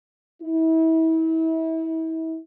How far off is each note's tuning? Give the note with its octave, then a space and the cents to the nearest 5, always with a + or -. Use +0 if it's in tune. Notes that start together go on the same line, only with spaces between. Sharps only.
E4 -35